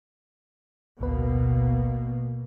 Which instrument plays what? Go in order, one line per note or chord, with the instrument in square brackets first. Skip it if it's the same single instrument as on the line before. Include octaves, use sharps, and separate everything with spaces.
[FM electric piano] A1 D2 B4 [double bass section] B2 A#3